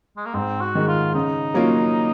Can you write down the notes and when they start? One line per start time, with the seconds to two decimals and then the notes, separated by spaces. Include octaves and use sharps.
0.17 G#3
0.26 A#3
0.34 G#2 C4
0.61 F#4
0.75 D#3 G#3
0.88 F4
1.15 C#3 D#4
1.54 F#3 A#3 C#4 F4